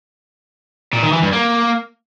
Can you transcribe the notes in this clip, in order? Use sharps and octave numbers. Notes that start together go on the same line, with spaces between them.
A#2
D#3
E3
G2
A#3